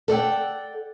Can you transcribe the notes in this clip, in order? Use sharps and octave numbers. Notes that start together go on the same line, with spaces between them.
A4 D5 F#5 G5